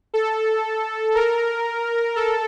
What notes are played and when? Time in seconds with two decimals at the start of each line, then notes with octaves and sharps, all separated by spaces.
0.14 A4
1.15 A#4
2.16 A4